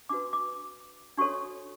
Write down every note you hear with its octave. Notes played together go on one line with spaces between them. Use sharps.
D4 F#4 B4 D6
D6
D4 F#4 A4 C#5 C#6